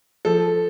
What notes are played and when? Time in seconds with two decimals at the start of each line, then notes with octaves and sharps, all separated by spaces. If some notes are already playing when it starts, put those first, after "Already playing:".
0.25 F3 A4